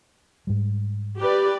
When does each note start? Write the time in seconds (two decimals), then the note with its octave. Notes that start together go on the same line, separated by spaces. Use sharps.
0.47 G#2 G3
1.18 G4 B4 D5